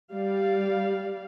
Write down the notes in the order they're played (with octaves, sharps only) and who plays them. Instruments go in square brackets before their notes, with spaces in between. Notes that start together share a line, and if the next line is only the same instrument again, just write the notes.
[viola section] G3 D5 F5